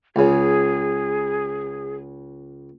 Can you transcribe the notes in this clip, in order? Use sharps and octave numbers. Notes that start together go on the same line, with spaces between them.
C#2 C#3 G#4